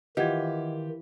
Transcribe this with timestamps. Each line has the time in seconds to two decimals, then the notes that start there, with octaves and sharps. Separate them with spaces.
0.17 D#3 E3 F4 G4 D#5 F#5 G#6